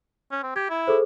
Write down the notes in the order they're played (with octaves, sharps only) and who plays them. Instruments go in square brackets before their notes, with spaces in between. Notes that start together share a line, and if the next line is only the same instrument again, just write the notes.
[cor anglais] C#4
C4
[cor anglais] G4 [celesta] G#6
[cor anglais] E4
[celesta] G#4 A4 C5